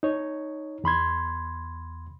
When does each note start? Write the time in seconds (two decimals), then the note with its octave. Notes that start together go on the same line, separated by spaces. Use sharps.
0.03 D#4 C#5
0.84 E2 B5 C6 G#6